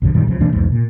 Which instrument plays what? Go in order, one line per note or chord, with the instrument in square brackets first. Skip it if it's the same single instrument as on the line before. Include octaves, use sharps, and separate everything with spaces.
[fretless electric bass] B1 F#2 D3
F#2 A#2 D#3 G3
C#2 C#3 F3
B2 E3 A3 D4
B1 E2 G#2
A#2